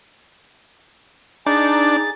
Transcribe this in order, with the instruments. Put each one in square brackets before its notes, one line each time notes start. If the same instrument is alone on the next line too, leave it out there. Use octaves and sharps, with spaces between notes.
[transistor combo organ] D4 [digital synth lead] D#4 [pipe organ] G#4 A6